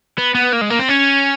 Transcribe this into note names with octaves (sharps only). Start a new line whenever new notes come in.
B3
B3
A#3
G#3
A#3
C4
C#4